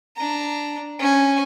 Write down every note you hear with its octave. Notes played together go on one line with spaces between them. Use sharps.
D4 A#5
C#4 G#5